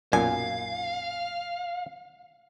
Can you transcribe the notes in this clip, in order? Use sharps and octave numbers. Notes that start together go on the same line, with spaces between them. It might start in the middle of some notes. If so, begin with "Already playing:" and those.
B1 F#2 A#2 F5 G#5